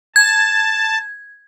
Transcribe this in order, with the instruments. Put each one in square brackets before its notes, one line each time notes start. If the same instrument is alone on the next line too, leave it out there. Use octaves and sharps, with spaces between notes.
[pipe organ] A5 [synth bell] G#6